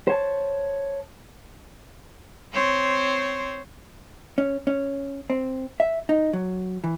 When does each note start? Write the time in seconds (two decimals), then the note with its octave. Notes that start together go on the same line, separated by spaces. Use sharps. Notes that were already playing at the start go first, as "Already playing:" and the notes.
0.07 C5 C#5 A5
2.54 C4 C5 C#5
4.38 C#4
4.67 C#4
5.30 C4
5.80 E5
6.09 D#4
6.33 F#3
6.84 E3